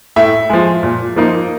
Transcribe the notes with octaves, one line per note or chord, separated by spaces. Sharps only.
A2 E5
F3 G#3
A#2
F3 A#3 D#4